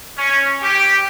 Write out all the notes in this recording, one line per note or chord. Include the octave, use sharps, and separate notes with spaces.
C#4
G4